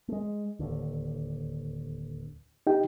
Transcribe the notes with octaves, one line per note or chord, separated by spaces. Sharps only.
G#3 A3
D1 D#2 D3
D#4 G4 G5